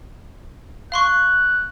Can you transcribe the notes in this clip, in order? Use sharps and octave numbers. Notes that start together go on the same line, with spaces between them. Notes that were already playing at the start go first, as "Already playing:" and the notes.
F5 C6 C#6 F#6